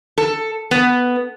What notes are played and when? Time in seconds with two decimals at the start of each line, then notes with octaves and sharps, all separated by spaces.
0.18 A4
0.71 B3